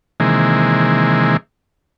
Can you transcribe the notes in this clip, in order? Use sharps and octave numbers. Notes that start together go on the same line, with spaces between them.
C3 D#3 E3 G#3 A#3